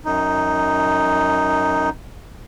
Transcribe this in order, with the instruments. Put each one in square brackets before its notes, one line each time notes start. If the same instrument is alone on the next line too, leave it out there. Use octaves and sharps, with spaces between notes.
[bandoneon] F#2 D#4